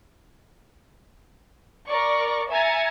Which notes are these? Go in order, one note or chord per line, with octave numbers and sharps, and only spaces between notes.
A#4 D5 C#6
E5 G#5 A#5 G#6 A6 C#7